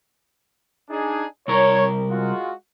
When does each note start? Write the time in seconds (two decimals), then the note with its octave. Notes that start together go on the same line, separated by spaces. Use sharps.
0.90 D4 D#4 G#4
1.48 C2 A#4 C#5
2.08 G#3 F4 F#4